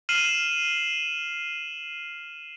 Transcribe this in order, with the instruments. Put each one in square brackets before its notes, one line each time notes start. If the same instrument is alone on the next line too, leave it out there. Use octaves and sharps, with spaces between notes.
[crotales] F6 C7 D#7 E7 F#7